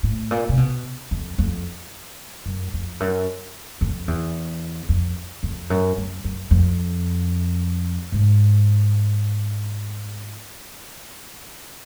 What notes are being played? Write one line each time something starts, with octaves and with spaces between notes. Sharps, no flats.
A2
A#2
C3
B2
F2
F2
F#2
F2
F#2
F2
E2
F2
F2
F#2
F#2
F#2
F2
G#2